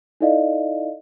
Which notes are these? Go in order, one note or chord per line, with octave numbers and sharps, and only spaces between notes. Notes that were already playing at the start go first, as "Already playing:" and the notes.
D#4 E4 A4 D5 D#5 F5